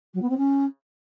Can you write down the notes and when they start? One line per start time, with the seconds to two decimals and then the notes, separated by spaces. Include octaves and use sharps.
0.14 F#3
0.22 B3
0.29 C4
0.37 C#4